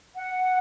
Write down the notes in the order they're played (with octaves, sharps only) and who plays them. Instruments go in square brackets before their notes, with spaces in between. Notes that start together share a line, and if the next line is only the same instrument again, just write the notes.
[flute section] F#5